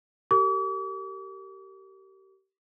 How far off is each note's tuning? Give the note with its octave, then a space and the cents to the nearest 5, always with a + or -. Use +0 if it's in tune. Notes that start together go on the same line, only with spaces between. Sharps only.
G4 -30 A#4 -40 D6 -45